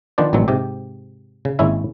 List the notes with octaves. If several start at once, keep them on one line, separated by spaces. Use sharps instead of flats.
D#3 F3 B3 D4 C5 D5
A1 B2 D#3 F#3 G3 C4
G#2 C3 G4
C#3
G#1 G#3 A#3 C#4 E4 E5